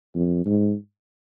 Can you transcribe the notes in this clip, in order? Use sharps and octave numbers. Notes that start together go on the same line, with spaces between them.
F2
G#2